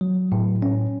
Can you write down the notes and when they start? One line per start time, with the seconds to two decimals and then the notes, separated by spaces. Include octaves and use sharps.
0.01 F#3
0.32 A2
0.62 C#4